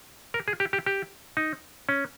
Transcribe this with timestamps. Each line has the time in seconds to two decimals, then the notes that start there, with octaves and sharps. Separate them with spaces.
0.34 A#4
0.48 G#4
0.60 G4
0.73 G4
0.86 G4
1.37 D#4
1.89 C#4